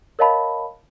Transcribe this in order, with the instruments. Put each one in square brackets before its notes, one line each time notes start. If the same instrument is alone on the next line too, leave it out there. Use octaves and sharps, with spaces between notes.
[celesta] A#4 C#5 D#5 F5 A5 B5